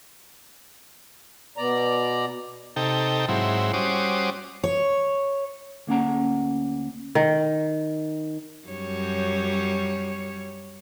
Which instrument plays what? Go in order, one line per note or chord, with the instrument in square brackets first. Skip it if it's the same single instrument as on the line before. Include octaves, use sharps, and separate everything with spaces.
[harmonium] B2 D5 A#5
[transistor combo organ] C3 D#4 A4 G5
G#2 F#3 C4 E4
G3 C#4 F#4 C5 D6 D#6
[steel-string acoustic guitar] C#5
[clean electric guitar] D2 A#3 C#4 F#5 A#5
[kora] D#3
[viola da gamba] F#2 G3 C#5